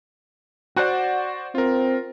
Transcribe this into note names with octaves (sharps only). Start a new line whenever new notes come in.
F#4 C5 D5 F#5
C4 F4 A#4